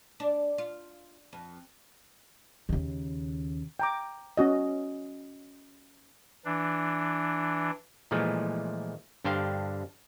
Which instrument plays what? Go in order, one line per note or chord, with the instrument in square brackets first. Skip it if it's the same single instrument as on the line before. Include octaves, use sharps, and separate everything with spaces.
[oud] D4
F4
F2
[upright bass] D#2 C#3
[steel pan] G5 A#5 D6
C#4 F#4 D#5
[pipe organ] E3 D4
[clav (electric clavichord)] A#2 E3 F3 G#3 A3
G2 D3 D4 C5 F5 G5